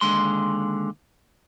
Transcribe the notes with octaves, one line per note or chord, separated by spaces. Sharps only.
D#2 D3 G#3 C6